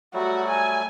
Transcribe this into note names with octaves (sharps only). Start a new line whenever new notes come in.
F#3 G3 A3 F#4
G#5